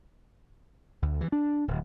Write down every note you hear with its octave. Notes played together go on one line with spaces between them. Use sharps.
D2
E3
D4
D1